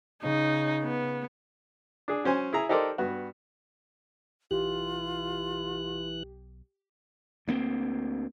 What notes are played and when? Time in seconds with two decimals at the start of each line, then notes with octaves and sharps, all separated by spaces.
0.23 C#3 D#4
0.83 B3
2.08 D4 G#4
2.24 F#3 C#4 C5 G#5
2.53 E4 G#4 A#5
2.69 D#4 G4 A4 A#4 C5 D5
2.98 G2 B3 F#4
4.51 B1 E3 F4 G4 F#6
7.48 D2 A#3 C4